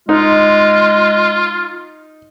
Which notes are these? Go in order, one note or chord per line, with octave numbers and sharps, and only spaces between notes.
G#3 D#4 F4